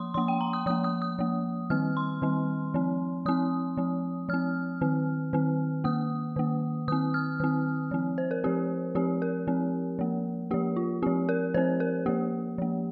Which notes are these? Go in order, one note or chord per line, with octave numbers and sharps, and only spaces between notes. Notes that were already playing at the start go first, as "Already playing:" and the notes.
Already playing: F3 A#3 C6 D#6
F3 A#3 C6
G5
A#5
D#6
F3 A#3 D#6
D#6
D#6
F3 A#3
D#3 G3 C4 F6
C6
D#3 G3 C4
F3 C4
F3 C4 D#6
F3 C4
F3 C4 F6
D#3 C4
D#3 C4
D#3 A#3 D#6
D#3 A#3
D#3 C4 D#6
F6
D#3 C4
F3 C4
C5
A#4
F3 C4 G4
F3 C4 G4
A#4
F3 C4
F3 A#3
F3 A#3 G4
F4
F3 C4 G4
A#4
F3 C4 C5
A#4
F3 A#3 G4
F3 A#3